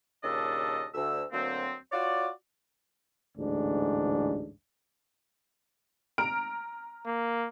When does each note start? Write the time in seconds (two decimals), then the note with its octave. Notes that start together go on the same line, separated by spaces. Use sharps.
0.24 D#2 A#2 C#3 D4 A4 D#5
0.94 D2 E6
1.32 D2 F#3 A#3 C4
1.92 F4 F#4 C#5 D5
3.37 A1 D2 G#2 D4
6.18 A#5 F6 D7
7.06 A#3